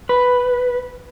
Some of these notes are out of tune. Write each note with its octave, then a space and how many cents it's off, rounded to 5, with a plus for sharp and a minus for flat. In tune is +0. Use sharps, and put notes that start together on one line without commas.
B4 +0